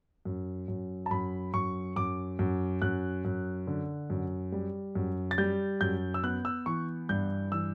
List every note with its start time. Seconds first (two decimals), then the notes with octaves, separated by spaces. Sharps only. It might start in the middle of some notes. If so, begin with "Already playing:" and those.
0.25 F#2
0.68 F#2
1.06 A5
1.11 F#2 B5
1.54 F#2 C#6
1.96 F#2 D6
2.39 F#2
2.82 F#2 F#6
3.25 F#2
3.67 D3
4.10 F#2
4.52 G3
4.95 F#2
5.31 A6
5.38 G3 G6
5.81 F#2 G6
6.14 E6
6.23 B3 F#6
6.45 E6
6.66 E3 C#6
7.09 G2 G6
7.52 E3 E6